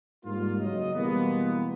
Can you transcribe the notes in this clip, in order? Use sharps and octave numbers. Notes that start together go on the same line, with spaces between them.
G#2 G3 A#3 F4
F#1 F#3 D#5
B2 E3 G3 G#3 A#3 B3